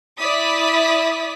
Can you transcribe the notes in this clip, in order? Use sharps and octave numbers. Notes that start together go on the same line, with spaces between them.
E4 D5 D#6 B6